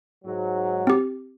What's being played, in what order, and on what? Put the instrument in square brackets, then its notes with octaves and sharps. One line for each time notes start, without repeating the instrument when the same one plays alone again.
[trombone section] G#2 F#3
[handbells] C4 G4